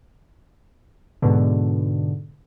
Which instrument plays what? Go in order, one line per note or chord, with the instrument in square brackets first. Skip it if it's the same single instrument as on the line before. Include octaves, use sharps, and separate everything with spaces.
[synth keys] G#2 B2 D3